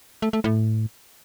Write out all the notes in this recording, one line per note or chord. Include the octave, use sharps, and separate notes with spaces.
A3
A3
A2